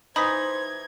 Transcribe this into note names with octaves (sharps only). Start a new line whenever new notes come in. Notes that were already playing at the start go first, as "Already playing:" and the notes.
E3 D#4 C5 B5 D#6 G#6 B6